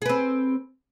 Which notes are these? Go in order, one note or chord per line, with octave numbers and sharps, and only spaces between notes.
C4 G#4 B4